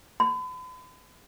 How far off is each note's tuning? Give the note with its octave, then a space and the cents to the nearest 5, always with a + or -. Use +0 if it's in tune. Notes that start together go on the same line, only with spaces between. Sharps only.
B5 +40